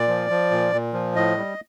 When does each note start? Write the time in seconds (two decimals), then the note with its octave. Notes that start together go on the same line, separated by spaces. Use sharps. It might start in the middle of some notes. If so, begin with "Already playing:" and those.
Already playing: A#2 D5
0.08 F3
0.30 F3
0.51 A#2
0.73 A#2
0.93 F3
1.16 A2 D#5
1.37 G3